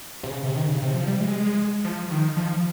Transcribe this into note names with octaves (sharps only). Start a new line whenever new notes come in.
C3
C#3
C3
D#3
C#3
C3
F3
G3
G#3
F3
D#3
F3